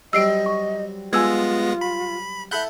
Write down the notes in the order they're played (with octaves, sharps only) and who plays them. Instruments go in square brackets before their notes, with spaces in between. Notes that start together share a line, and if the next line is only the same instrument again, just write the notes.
[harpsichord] F#3 G3 C4 [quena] D#5 [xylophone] E6 C7 D7
[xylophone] C#6
[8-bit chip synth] G#3 B3 A#6 [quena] F4 [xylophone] G#5 E6 G#6
[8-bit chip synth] B5
[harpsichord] E4 A4 F#5 [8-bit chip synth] B5 F#6 G6